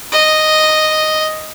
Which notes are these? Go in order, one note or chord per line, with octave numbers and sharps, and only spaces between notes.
D#5